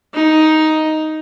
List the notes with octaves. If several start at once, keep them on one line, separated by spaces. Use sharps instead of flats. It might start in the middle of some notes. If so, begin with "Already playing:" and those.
D#4